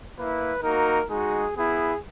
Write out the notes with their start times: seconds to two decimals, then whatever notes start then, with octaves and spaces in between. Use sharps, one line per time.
0.15 A#3 E4 B4
0.62 A#3 D#4 F#4 A#4
1.08 G#3 D#4 F#4 G#4
1.55 B3 E4 G#4